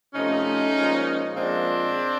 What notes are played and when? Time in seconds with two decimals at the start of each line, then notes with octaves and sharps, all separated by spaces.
0.14 C3 F3 A3 C#4 D#4
0.75 A#2 F3 G#3
1.35 A#2 F3 G#3 C4 D4